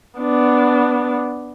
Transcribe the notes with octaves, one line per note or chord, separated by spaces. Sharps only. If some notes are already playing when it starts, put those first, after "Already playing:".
B3 D4